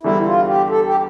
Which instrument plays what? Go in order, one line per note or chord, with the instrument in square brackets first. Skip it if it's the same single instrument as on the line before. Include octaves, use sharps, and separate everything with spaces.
[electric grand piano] E2 D3 G3 [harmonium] E4
[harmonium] F4
G4
A4
G4